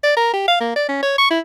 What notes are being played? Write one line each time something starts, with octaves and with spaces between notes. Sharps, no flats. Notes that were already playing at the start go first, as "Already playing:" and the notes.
D5
A#4
G4
F5
A#3
D5
C#4
C#5
C#6
E4